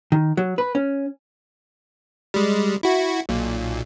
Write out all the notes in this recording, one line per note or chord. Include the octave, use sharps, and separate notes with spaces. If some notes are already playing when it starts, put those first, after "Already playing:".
D#3
F#3
B4
C#4
G3 G#3
E4 F#4
B1 A#2